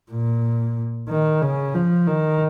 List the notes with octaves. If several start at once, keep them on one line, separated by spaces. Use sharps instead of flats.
A#2
D#3
C#3
F3
D#3